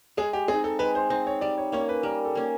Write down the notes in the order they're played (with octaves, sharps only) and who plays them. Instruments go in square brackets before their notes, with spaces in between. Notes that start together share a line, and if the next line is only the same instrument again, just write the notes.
[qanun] G#3 [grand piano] G#4
[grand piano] G4
[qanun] C4 [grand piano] G#4
[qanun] D#4
[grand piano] A4
[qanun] G#3 [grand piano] B4
[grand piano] C5
[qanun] C4 D#4 [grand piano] C5
[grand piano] C#5
[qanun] G3 [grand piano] D5
[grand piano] C#5
[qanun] A#3 C#4 [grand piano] C#5
[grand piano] B4
[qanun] G3 [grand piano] A#4
[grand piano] A4
[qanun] A#3 C#4